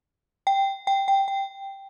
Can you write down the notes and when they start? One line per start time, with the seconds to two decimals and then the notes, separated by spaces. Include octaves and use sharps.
0.47 G5
0.87 G5
1.08 G5
1.28 G5